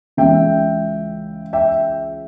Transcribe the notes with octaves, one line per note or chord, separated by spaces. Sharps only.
C#2 C#3 E3 E5 G5
E5 G5